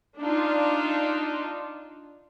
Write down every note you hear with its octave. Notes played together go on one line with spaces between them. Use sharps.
D4 D#4 F4